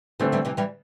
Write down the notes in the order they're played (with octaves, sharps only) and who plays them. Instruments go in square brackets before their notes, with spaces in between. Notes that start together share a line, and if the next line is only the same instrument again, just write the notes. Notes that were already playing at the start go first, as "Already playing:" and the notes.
[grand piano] D3 A3 C4 [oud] E3 G3
[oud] E3 G3
C3 E3
E3 G3